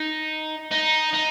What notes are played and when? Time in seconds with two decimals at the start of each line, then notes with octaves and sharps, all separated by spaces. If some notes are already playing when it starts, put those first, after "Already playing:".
Already playing: D#4
0.72 D#4
1.13 D#4